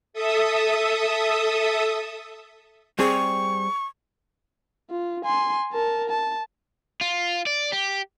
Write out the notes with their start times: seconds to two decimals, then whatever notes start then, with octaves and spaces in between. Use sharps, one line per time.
0.13 A4 E5 D#6
2.99 G3 C4 G#4 C#6
4.90 F4
5.25 G#5 C6
5.73 A#4 A5
6.09 A5
7.01 F4
7.46 D5
7.72 G4